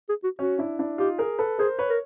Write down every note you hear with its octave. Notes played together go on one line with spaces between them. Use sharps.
G#4
F#4
C#4 F#4
D4 E4
D4 E4
D#4 F4 G4
G#4 A#4
A4 B4
G#4 A#4 C5
B4 C#5
A#4